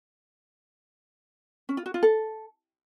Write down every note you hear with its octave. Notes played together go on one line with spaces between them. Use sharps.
C#4
F4
F#4
F4
A4